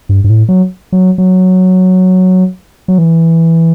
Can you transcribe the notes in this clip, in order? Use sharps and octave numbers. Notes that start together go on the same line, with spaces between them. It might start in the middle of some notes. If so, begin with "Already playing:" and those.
G2
G2
A2
F#3
F#3
F#3
F#3
E3